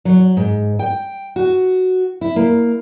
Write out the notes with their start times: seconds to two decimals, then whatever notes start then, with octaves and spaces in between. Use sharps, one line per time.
0.05 F#3
0.37 G#2
0.79 G5
1.36 F#4
2.21 E4
2.36 A#3